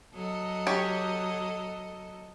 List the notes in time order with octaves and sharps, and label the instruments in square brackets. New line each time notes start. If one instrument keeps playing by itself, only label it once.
[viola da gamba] F#3 A4 D#5
[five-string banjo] G4 C#5